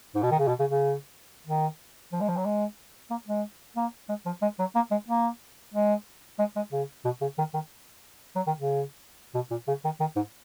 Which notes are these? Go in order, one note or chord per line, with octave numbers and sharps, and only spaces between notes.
G#2
B2
D#3
C#3
B2
C#3
C#3
D#3
F3
G#3
F3
F#3
G#3
A#3
G#3
A#3
G#3
F3
G#3
F#3
A#3
G#3
A#3
G#3
G#3
G#3
C#3
B2
C#3
D#3
D#3
F#3
D#3
C#3
B2
A#2
C#3
D#3
D#3
G#2